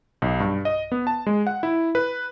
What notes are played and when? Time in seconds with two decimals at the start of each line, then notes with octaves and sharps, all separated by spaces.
0.22 B1
0.40 G2
0.65 D#5
0.92 B3
1.07 A5
1.27 G#3
1.47 F#5
1.63 E4
1.95 B4